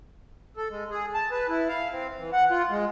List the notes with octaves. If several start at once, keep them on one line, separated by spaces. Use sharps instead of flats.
A4
G#3
G#4
A5
B4
E4
F5
C4
E3
F#5
F4
G#3